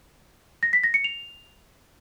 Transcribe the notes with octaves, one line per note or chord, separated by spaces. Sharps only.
A#6
B6
A#6
C#7
F7